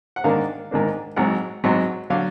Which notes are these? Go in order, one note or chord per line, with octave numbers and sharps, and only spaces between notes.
F#5
G#2 D#3 A#3 D4 F5
G#2 D#3 A#3 D4
G#1 G#2 F#3 F#5
G#1 G#2 F#3
D3 F#3 D4 F5